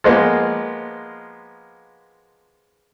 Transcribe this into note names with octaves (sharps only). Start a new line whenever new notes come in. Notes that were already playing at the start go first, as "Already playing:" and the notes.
F3 G#3 A#3 B3